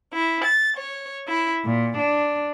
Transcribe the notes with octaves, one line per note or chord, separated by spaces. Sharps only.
E4
A6
C#5
E4
A#2
D4